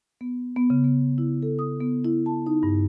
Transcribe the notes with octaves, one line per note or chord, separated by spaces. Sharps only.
B3
B3
C#3
B3
E4
A4
D#6
B3
E4
A5
D#4
G2